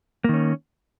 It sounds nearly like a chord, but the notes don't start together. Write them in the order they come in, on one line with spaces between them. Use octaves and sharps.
A#3 D#3 C#4